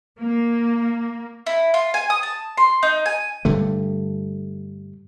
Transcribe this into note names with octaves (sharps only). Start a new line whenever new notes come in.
A#3
E4
F4
G#5
D#6
A5
C6
D#4
G#5
G2 D3 A3